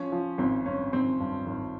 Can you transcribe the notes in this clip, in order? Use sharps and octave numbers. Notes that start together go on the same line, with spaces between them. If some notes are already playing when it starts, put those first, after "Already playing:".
Already playing: F3 C#4
F3
G#1 C4
G2 C#4
G#1 C4
G2
G#1